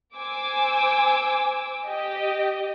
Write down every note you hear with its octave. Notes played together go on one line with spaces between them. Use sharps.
C5 G#5 D6 E6
G4 D#5